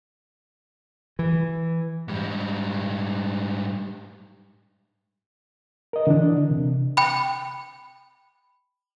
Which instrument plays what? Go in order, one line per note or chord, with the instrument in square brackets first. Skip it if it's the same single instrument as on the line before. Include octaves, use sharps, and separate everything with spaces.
[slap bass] E3
[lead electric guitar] G#2 G3
[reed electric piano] A#4 D#5
D3 E3 D4
C3
[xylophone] G5 B5